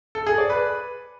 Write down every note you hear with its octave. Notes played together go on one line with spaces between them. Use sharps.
A4
G#4
D5
B4